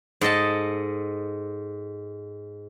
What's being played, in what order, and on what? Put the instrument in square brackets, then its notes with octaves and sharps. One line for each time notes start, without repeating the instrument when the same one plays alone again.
[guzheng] G#2 A4 D#5 A5